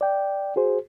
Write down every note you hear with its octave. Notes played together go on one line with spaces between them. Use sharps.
D5 G5
F#4 G#4 C5